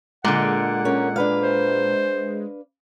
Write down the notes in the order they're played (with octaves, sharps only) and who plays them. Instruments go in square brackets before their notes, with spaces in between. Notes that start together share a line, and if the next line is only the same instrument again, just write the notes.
[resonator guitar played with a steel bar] A#2 D3 [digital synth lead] G#3 [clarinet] F#5
[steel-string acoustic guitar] C#4 A#4
D4 B4 F5
[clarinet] C5